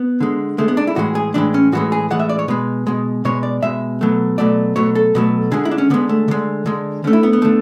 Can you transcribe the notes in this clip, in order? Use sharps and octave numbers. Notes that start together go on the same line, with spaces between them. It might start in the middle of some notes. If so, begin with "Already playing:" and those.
Already playing: B3
D3 G#3
D3 G#3 A3
B3
D4
E4
A2 E3 G#3 F#4
G#4
A2 E3 G#3 D4
C#4
A2 E3 G#3 F#4
G#4
A2 E3 G#3 F#5
E5
D5
C#5
B2 G#3 B4
B2 G#3
B2 G#3 C#5
D5
B2 G#3 E5
B2 F#3 A3
B2 F#3 A3 D5
B2 F#3 A3 C#5
A4
B2 F#3 A3
D3 G#3 G#4
E4
D4
C#4
D3 G#3 B3
A3
D3 G#3
D3 G#3
D3 A3 C#4
E4
B3
B3
D3 A3